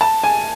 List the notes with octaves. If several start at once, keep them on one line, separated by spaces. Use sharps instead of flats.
A5
G#5